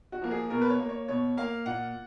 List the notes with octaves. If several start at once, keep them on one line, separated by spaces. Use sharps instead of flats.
F#4
F3 A#3
G#4
B2 A#4
B4
C#5
A#3
C#5
B2 C#5
A#3 F5
A#2 F#5